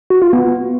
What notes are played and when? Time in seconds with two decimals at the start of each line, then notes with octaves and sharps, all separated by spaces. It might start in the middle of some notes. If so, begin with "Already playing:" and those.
0.10 F#4
0.22 F4
0.33 B3